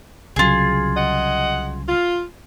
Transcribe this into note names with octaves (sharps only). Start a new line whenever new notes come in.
C2 C#3 F#3 F4 G#4
D#5 F#5
F4